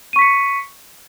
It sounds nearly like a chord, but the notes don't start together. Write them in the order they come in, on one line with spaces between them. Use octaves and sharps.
D#7 C#6 B6 C#7